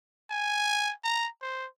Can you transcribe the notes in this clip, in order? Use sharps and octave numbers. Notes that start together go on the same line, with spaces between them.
G#5
A#5
C5